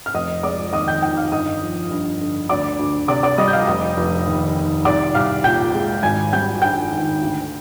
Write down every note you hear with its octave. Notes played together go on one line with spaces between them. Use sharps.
F6
F1 D#5 D#6
G#3 D5 D6
D#2 D#5 D#6
G5 G6
D#3 G5 G6
F5 F6
G1 D#5 D#6
F3
G2
D3
D2 D5 D6
D2
C3 D5 D6
D5 D6
G3 D#5 D#6
G6
F5 F6
F1 D#5 D#6
F1
D#2
D#3
C2 D5 D6
C2 F5 F6
A#2 G5 G6
G#3
G#1 G#5 G#6
G3 G5 G6
G2 G5 G6
D#3
D2